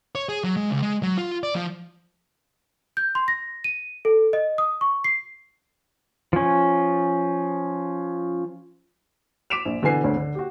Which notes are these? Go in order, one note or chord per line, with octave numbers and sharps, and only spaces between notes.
C#5
G#4
F#3
G#3
C#2
G#3
F#3
F4
D5
F3
G6
C6
A#6
D#7
A4
D#5
D#6
C#6
C7
F3 C#4
D6 B6 D7 E7 F7
A#1
B2 D3 E3 B4 G#5 C7
D2 D3 C#5
D3
F#4 G4